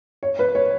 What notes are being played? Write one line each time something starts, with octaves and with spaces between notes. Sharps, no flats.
C#5
B4
C#5